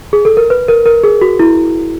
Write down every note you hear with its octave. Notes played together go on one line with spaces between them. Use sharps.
G#4
A4
A#4
B4
A#4
A#4
G#4
F#4
E4